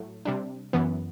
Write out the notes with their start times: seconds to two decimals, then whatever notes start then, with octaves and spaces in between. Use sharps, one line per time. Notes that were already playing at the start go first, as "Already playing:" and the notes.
Already playing: A2 F#3 A3
0.25 C3 G3 D4
0.73 F#2 E3 B3